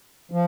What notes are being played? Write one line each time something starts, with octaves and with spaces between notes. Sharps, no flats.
F3